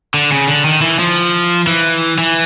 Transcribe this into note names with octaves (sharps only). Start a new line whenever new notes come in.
D3
C#3
D3
D#3
E3
F3
E3
E3